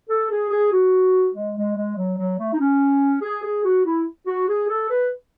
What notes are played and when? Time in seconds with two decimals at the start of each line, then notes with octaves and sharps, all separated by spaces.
0.09 A4
0.30 G#4
0.50 G#4
0.72 F#4
1.34 G#3
1.56 G#3
1.76 G#3
1.97 F#3
2.18 F#3
2.38 A3
2.53 D#4
2.60 C#4
3.22 G#4
3.43 G#4
3.65 F#4
3.85 E4
4.27 F#4
4.48 G#4
4.69 A4
4.90 B4